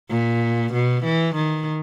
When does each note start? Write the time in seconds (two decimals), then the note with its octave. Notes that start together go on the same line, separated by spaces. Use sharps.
0.10 A#2
0.73 B2
1.04 E3
1.35 D#3